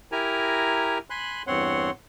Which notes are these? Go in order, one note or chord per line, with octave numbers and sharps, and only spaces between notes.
E4 G4 A#4 G#5 A#5
G#5 B5 C6 F#6
E2 G2 C4 C#5 F#5 C6